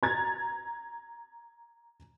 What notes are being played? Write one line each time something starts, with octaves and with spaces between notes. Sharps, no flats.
A#5 G#6 A6